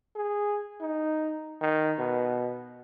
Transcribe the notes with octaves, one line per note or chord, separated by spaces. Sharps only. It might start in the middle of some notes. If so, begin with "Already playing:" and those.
G#4
D#4
D#3
B2